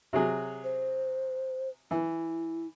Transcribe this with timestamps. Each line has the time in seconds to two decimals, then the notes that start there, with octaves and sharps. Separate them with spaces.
0.13 C3 F#3 G#4
0.64 C5
1.91 E3 E4